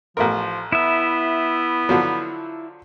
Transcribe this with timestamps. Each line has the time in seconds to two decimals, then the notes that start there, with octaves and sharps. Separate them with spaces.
0.17 A1 F3 A3 A#4
0.72 B3 E4 E5
1.89 D3 F3 F#3